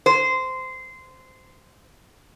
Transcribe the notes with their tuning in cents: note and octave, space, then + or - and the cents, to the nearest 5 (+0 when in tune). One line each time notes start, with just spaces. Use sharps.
C5 -15